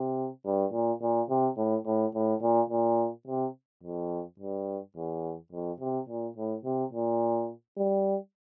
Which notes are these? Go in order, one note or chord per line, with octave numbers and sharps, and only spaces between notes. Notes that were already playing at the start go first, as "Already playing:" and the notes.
Already playing: C3
G2
A#2
A#2
C3
A2
A2
A2
A#2
A#2
C3
F2
G2
E2
F2
C3
A#2
A2
C3
A#2
G3